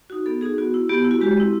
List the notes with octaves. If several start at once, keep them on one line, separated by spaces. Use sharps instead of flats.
D#4 F#4
B3 A4
D#4 F#4 G#4
B3 F#4
E4
B3 G4
E4
F#4
G#3 G4
C4 E4